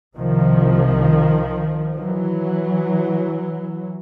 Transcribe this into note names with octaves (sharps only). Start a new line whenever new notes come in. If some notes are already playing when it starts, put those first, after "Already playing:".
C2 C3 D#3 F3
E3 F#3